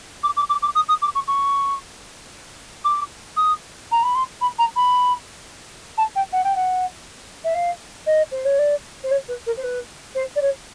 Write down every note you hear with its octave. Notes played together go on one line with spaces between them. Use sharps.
D6
D6
D6
D6
D#6
D#6
D6
C#6
C#6
D6
D#6
A#5
B5
C6
B5
A#5
B5
A5
G5
F#5
G5
F#5
E5
F5
D#5
C5
C#5
D5
C5
C#5
B4
A#4
C5
B4
C5
D5
C#5